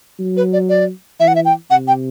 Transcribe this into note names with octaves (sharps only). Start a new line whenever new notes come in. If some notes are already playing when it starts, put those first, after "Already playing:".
F#3
B4
D5
D5
E3 E5
F#5
E5
G5
C3 F#5
G5